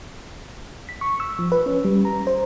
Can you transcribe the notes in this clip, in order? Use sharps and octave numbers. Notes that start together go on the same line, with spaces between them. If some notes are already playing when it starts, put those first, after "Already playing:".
B6
C#6
E6
F3
B4
C#4
G3
A#5
C5